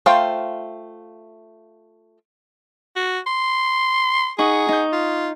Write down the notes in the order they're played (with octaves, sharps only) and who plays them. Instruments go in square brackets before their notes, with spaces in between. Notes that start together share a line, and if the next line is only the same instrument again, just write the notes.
[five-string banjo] A3 F4 C5 F5 G5
[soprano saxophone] F#4
C6
[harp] D#4 F#5 C#6 [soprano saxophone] G#4
[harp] D#4 G6
[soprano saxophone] F4